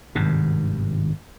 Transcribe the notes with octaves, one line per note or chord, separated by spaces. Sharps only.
G#1 G2 C3 D#3